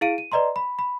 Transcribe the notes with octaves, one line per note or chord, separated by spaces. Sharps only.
E4 G#4 F5 D7 D#7
D#7
B4 D5 D#5 A#5 C6
B5
B5